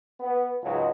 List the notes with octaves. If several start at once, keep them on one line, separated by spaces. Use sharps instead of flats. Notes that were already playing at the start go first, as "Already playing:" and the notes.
B3
C#2 G#2 C#3 F#3 D#4